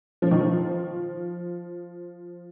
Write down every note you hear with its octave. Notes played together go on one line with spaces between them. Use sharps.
F3
D#3
F3